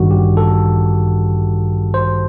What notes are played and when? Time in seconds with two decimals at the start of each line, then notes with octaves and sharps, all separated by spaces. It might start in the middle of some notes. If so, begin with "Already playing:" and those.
Already playing: A1 G2 D#3 G3 F#4
0.11 G4
0.37 A4
1.94 C5